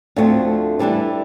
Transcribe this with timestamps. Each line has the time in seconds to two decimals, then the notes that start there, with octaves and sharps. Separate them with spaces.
0.16 D2 D3 F3 A3 C4
0.79 E3 G3 D4 A4